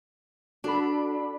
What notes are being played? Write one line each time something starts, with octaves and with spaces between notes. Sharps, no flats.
D4 F#4 A4 B5